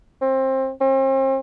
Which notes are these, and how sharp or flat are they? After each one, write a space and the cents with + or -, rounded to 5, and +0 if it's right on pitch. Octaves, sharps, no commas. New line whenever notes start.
C4 +25
C4 +40